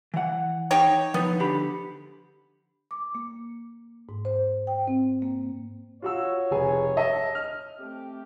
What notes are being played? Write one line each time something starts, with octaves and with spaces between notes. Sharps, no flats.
E3 F#5
D#4 G4 C#5
F3 B3 D#4
D3 G4 B5
D6
A#3
G#2
C5
G5
C4
A#3
F4 F#4 C#5 E6
F1 G#4 G#5
D#5 E5 A5
F6
A3 C4 G4